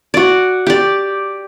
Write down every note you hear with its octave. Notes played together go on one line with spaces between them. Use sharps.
F#4 D5
G4 D5